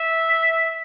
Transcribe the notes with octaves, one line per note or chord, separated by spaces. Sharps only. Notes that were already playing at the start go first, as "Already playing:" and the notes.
Already playing: E5
B6